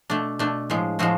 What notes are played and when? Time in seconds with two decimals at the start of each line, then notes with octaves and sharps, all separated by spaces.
0.10 B2 A3 D4
0.39 B2 A3 D4
0.70 A2 F3 G#3
0.99 A2 F3 G#3 F#4